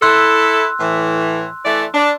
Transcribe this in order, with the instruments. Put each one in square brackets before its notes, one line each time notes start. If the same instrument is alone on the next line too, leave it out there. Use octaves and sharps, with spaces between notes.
[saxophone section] E4 A4 [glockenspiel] C6 E6 F#6
[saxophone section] A2 E3
E3 A3 D5
D4